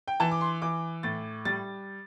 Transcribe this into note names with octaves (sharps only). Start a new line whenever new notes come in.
G5
E3 A5
D6
C6
E3 D6
A2 A6
G3 A6